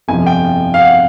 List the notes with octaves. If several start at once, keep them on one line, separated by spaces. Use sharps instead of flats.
G1 F2 C3 F3 G#5
G5
F5
F#5